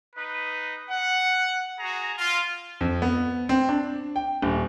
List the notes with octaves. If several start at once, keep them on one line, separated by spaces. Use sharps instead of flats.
D#4 B4
F#5
F#4 G#4 A#5
F4
F2
B3
C4
D4
G5
D#1